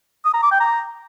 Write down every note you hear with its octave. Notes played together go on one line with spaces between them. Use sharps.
D#6
A#5
D6
G5
A#5